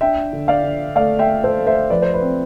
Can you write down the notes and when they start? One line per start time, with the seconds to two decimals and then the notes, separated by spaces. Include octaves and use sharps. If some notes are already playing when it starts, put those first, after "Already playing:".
0.01 D4 E5 G5
0.33 D3
0.48 D5 F5
0.64 D3
0.96 A3 D5 F5
1.19 E5 G5
1.27 A3
1.44 A4 C5
1.58 A3
1.67 C5 E5
1.90 F3 B4 D5
2.02 C5
2.14 B4 D5
2.22 C4